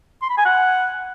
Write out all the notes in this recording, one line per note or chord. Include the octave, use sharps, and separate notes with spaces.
C6
B5
G#5
F#5